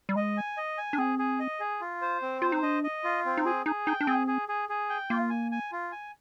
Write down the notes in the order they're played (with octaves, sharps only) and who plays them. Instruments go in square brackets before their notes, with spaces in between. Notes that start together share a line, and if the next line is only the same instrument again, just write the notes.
[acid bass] G3
[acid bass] G#3 [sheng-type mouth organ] D#5
[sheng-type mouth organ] G#5
D#5
G#5
[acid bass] D4
[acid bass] C4 [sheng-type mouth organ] G#4
[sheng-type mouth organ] G#4
D#5
G#4
F4
C5
C4
[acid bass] F4 [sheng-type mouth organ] C5
[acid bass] D#4
[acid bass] D4 [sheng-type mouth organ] D#5
[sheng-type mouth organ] D#5
F4
C4
[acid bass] D#4
[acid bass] F4 [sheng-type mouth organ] G#4
[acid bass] D#4 [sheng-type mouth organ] G#4
[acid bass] D#4 [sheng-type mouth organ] G5
[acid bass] D4
[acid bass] C4 [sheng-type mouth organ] G#4
[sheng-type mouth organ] G#4
G#4
G#4
G5
[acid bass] A#3 [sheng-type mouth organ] F4
[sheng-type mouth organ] G#5
G#5
F4
G#5